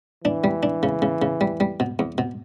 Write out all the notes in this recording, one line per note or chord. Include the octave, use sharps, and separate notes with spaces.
E3 D4
G3
D4
C#3
C#3
C#3
G3
G3
B2
E2
B2